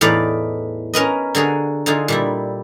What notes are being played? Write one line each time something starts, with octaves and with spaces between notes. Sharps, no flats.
E2 A2 D#4 B4 D5 F5
C#4 A#4 B4 D#5
D3 F#4 G#4 A#4
D3 D#4 F4 G#4
A#2 G3 E4